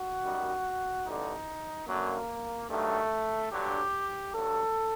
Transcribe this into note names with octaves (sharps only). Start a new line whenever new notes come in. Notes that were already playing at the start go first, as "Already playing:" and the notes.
Already playing: F#4
F#2 D#3 G3
A1 G2 D3 D#4
F#2 D3 F#3 A#3
G2 D#3 F#3 A3
G2 D3 F#3 G4
G2 F#3 A4